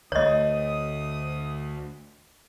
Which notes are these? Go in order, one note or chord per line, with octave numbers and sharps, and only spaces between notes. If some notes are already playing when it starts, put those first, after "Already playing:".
D2 A3 C#5 D#5 D#6